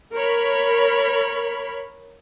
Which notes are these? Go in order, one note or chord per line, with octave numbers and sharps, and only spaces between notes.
A#4 C#5 B5